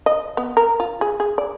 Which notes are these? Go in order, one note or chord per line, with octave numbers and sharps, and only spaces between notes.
D#5
B3
A#4
F4
G#4
G#4
D5